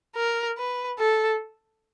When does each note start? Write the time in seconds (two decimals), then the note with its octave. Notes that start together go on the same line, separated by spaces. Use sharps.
0.17 A#4
0.58 B4
0.99 A4